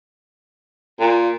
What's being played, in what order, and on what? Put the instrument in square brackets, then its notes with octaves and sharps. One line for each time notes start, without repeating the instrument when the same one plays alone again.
[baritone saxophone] A#2